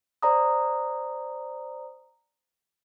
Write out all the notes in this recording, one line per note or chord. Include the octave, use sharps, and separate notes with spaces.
C5 D5 A#5 D#6